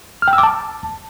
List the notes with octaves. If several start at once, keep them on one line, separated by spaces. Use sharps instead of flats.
F6
G5
E6
D6
A5